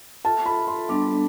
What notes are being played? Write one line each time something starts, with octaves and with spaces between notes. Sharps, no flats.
F4 A4 E5 A5
B5
C6
G3 B3 D4 A4 D6